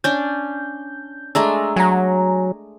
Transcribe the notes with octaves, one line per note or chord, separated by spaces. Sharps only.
C#4 D4 G6
G#3 A3 D4 G#5 A#5 E6
F#3 G#5 A#5